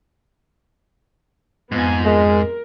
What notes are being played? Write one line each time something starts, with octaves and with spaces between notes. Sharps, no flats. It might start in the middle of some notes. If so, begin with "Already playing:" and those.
F2 G#2 F3 B3 G#5
G#3 A#4